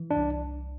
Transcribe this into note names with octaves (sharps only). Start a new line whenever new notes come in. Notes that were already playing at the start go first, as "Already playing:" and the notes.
Already playing: E3
D4
C2